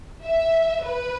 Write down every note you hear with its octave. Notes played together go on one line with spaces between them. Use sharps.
E5
B4